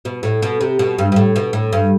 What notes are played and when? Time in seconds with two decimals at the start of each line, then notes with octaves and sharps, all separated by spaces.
0.05 B2
0.23 A2
0.42 B2
0.61 C3
0.79 B2
0.98 G2
1.12 G2
1.16 A2
1.36 B2
1.53 A2
1.73 G2